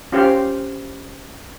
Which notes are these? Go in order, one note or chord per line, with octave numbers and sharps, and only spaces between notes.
C#4 F4 G4 C5 F5